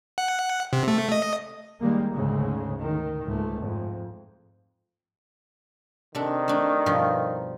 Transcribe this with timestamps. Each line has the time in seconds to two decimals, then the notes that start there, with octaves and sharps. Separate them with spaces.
0.18 F#5
0.73 C3
0.88 A3
1.12 D#5
1.80 D#3 G3 G#3 A#3
2.12 D2 G#2 C#3 G#3
2.82 D#3
3.26 C#2 G#2 A3
3.61 F2 G#2
6.15 C3 D#3 D4 A4
6.48 A3 D4
6.86 G2 B2 F3